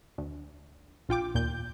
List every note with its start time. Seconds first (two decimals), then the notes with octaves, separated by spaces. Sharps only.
0.18 D2
1.09 A#1 F4 G5 D6
1.35 D#2 A#2 G6